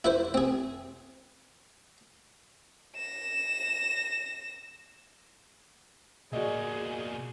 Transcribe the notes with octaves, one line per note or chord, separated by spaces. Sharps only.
E4 B4 C5
C4 G#4
A#6 E7
B2 A#3 F#4 G#4 D5 D#5